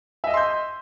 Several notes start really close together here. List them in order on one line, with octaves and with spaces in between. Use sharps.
E5 D#5 E6 C6 G6